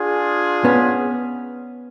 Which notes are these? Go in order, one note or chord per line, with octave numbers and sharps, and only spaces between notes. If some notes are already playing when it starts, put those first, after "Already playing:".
Already playing: D4 F4 G#4
B3 C#4